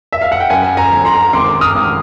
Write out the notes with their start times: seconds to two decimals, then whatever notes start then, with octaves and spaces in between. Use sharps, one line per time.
0.12 E5
0.21 F5
0.32 F#5
0.40 G5
0.50 F#2 F#5 G#5
0.77 G#5 A#5
0.92 G1
1.05 A#5 C6
1.33 G#1 C6 D6
1.61 D#6 F6
1.74 G#1